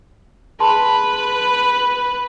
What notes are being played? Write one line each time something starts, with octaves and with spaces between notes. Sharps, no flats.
G#4 B4 A5 B5 C6